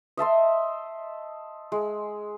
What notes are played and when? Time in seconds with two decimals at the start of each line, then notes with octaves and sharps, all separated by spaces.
0.17 D#5 E5 A5 C6
1.72 G#3